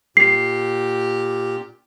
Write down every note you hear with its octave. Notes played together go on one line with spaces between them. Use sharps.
A#2 G4 C7